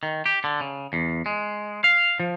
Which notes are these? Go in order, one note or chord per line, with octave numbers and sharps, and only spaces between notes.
D#3
G4
D3
C#3
E2
G#3
F5
F3